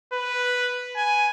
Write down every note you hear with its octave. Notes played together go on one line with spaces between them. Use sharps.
B4
G#5